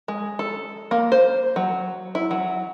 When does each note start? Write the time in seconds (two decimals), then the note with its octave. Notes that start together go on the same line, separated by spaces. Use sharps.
0.08 G#3
0.39 A4
0.91 A#3
1.12 C5
1.56 F#3
2.15 E4
2.31 F#3